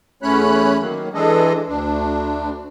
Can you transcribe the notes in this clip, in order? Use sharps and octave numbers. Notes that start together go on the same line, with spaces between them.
E2 A3 C#4 C#5 B5 F#6
D#3 F#3 A#3
E3 G#3 D4 G#4 A4 D#5
D2 D4